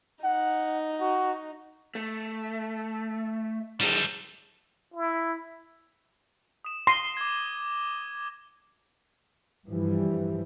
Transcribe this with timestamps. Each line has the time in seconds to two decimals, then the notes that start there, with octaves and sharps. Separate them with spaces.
0.24 D#4 F#5
1.01 F#4
1.95 A3
3.80 F#2 G3 G#3 A4
4.94 E4
6.65 D#6 E7
6.87 C6 A#6 D#7 G7
7.17 D6 G#6
9.68 G2 E3 F3 G3